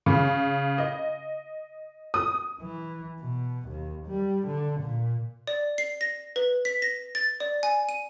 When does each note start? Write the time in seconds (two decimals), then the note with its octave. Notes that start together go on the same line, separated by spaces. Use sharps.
0.06 C#3
0.78 D#5
2.14 D#6
2.60 E3
3.20 B2
3.68 D#2
4.07 G3
4.47 D3
4.80 A#2
5.47 D5
5.78 C7
6.01 A#6
6.36 B4
6.65 B6
6.82 A#6
7.15 A6
7.40 D5
7.63 G#5
7.89 D#7